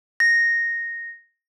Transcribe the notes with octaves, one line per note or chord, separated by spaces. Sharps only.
A#6